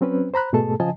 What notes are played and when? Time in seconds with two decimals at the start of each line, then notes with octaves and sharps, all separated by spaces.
0.01 F#3 C4 C#4 B4
0.34 C5 A#5 B5 F#6
0.53 G#2 B2 A3 G#4 A4 A5
0.80 C#3 F3 D#5 G#5 A5